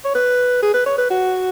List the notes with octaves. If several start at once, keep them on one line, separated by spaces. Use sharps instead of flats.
C#5
B4
G#4
B4
C#5
B4
F#4